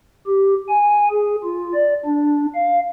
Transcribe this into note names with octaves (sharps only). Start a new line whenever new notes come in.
G4
G#5
G#4
F4
D5
D4
F5